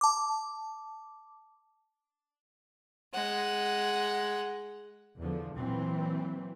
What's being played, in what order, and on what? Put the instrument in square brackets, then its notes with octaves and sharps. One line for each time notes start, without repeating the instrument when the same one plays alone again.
[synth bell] A5 D6
[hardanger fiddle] G#3 F#5
[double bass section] E2 D3 F3
A#2 E3 F#3 C4